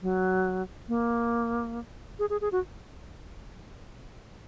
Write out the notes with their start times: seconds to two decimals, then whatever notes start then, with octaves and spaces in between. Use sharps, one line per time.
0.02 F#3
0.88 A#3
2.19 G#4
2.30 G#4
2.41 G#4
2.52 F#4